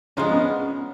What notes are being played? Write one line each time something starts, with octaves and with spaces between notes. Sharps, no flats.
G#2 F3 G#3 C#4 D4
B3
C#4